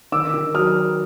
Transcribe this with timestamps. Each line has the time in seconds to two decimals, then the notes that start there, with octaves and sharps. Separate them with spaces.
0.12 D#3 D6 E6
0.34 D#3
0.54 F#3 D#6 F6